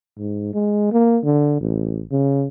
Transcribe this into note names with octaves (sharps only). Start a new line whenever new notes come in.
G#2
G#3
A#3
D3
A1
C#3